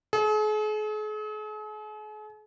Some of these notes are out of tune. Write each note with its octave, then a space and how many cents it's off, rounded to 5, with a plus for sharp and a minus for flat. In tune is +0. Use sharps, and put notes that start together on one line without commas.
G#4 +45